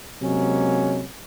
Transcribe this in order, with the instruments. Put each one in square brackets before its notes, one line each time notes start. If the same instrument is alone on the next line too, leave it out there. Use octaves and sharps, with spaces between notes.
[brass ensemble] C3 F#3 G#3 A#3 C#4